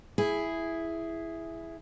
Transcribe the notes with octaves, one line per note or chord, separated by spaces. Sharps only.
E4 G#4